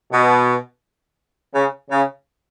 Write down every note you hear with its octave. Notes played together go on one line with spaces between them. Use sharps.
B2
C#3
C#3